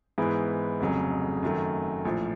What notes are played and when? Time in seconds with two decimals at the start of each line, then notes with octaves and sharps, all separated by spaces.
0.18 G#2 E3 G#3 B3
0.80 F1 F2 C#3 F#3
1.43 F#2 D#3 F#3 A3
2.05 A#1 A2 F3